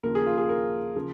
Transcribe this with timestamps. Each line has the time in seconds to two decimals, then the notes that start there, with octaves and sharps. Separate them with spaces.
0.03 D#2 C#3 F3 A#4
0.15 G#4
0.26 F4
0.38 G#4
0.49 A#4
0.96 C#3 F3